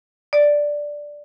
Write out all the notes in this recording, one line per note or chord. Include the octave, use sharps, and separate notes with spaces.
D5